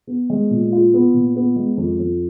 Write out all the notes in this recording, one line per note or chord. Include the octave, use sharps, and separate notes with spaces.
B3
G#3
A#2
F4
B3
A#2
B3
G#3
F2
F2